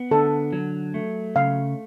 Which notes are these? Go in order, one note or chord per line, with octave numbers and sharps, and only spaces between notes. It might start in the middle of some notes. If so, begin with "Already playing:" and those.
Already playing: B3
D3 A4
F#3
A3
C#3 F5